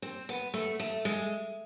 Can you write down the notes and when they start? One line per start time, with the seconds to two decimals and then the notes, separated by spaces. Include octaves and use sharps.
0.02 C4
0.29 B3
0.54 A3
0.80 A3
1.05 G#3